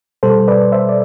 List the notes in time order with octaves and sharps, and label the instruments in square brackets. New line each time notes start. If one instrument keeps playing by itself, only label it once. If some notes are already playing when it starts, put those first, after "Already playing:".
[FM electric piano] B2 G3 A4 C5
B4 D5
C5 E5
D5